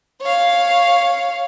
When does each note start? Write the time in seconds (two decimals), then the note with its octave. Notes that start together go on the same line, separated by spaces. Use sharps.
0.21 C#5 F5